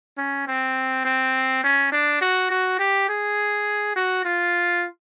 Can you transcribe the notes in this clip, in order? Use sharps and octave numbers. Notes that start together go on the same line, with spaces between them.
C#4
C4
C4
C#4
D4
F#4
F#4
G4
G#4
F#4
F4